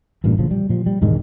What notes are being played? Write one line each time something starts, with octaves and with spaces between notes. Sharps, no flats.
A1 G2 A#2
A1 C#3 F3
G3
A#2 F3
G3
E1 G#2 D#3 G#3